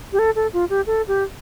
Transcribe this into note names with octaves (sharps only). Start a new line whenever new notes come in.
G4
A4
A4
F4
G4
A4
G4